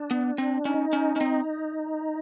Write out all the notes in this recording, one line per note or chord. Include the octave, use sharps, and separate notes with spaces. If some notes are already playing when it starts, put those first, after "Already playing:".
Already playing: D4
B3
C4
C#4 D#4
C#4
C#4
C4